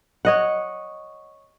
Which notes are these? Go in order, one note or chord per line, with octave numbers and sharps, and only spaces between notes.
C#5 D#5 F#5